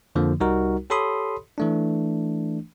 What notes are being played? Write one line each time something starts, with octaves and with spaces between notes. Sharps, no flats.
F2 D3 F3 A#3
C2 G3 D#4 F#4 A#4
G4 A4 C#5 B5 C6 D#6
E3 A3 D4